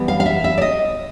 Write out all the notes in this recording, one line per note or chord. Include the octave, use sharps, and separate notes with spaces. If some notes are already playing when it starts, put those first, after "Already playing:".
Already playing: E3 G3 B3
F5
F5
E5
E5
D5
D#5